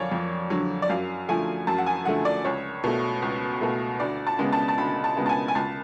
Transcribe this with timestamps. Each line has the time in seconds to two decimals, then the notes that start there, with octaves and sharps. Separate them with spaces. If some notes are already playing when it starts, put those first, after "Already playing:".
Already playing: F2 D3 F#3 C#5 D5 F5 G#5
0.12 F2
0.50 D3 F#3
0.82 D5
0.90 F#2 F5
1.28 D3 F3 A3 G#5
1.67 F#2 A5
1.78 F#5
1.86 G#5
2.05 D3 F3 A3 F#5
2.25 D5
2.44 C#2 C#5
2.84 B2 A3
3.22 C#2
3.61 B2 A3
4.00 D2 D5
4.27 A5
4.39 C#3 G#3 B3
4.52 A5
4.68 A5
4.78 D2 B5
5.04 A5
5.17 C#3 G#3 B3
5.26 A5
5.29 G#5
5.48 G#5
5.55 C#2 A5